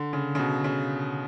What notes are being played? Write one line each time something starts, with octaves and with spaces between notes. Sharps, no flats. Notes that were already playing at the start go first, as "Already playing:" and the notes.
Already playing: D3
C#3
C#3
B2
C#3